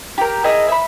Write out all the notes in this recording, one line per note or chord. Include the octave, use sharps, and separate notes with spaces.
G4 A#4
E4 G#4 A#4 D#5
E5 B5